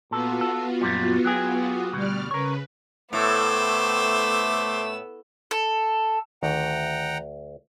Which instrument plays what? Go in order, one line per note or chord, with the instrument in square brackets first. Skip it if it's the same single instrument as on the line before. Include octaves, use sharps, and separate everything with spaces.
[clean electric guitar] A#2 A4 [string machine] B3 F4 F#4
[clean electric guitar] A4
F#2 A#2 G3
F#3 G4 G#4
[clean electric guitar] D2 B2 [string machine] G3 D5 F6
[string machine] C#3 B4 [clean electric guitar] A#4 C#5
[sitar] A2 [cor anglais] A3 [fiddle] B3 E6 [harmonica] C5 D6
[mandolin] A4
[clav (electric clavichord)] D2 [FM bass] D#3 [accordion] F#5 G5 A#5